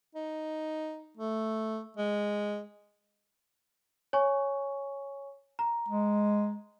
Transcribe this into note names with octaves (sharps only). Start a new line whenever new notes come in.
D#4
A3
G#3
C#5 G#5 C#6
A#5
G#3